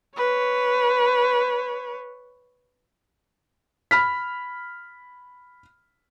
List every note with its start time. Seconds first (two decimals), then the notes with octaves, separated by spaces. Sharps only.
0.16 B4 C#5
3.91 B5 F6 B6